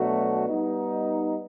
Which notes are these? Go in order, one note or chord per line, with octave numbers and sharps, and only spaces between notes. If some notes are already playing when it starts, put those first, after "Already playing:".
Already playing: B2 F#3 A3 D4 F#4
G3 B3 D#4